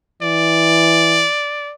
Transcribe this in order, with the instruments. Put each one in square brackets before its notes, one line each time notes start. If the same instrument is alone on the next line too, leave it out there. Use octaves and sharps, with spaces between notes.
[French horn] E3 [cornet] D5